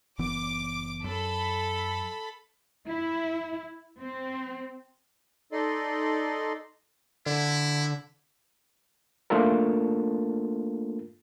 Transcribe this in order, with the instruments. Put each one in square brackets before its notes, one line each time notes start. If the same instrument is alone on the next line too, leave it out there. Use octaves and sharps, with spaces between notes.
[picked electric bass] F#1 E3 B3 [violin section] D6
[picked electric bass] F#2 [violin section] A4 B5
[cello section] E4
C4
[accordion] D#4 A4 D5 D#5 C6
[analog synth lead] D3 [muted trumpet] E4
[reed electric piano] A3 A#3 D4 F4 A4 A#4